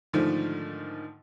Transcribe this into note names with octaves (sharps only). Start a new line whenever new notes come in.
G#2 D3 D#3 F3 A3